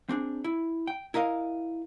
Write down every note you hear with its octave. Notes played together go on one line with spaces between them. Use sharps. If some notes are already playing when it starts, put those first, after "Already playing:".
C4 D4 G#4
E4
G5
E4 A#4 D#5 F5